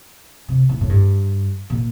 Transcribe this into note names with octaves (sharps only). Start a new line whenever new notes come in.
C3
A2
A2
G2
A#2